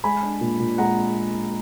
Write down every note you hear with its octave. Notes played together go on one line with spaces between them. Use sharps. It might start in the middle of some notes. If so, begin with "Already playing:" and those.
G#3 G#5 B5
D4
A#2
A#2
G#3 F#5 A#5